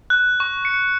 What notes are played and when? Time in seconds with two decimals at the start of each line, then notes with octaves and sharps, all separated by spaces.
0.10 F#6
0.40 C#6
0.65 C#7